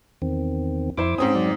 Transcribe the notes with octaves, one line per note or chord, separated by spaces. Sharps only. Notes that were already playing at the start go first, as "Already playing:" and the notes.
E2 D#3 C4
F2 E4 C5 D6
G#2 C4 C#4 D#6
F#3 D5